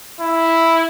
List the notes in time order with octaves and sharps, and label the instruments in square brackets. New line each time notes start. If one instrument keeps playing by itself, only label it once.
[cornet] E4